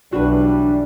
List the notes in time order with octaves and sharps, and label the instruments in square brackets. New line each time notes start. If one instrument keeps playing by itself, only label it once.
[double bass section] B1 E3 [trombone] G3 [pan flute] D4 [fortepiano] F#4 B4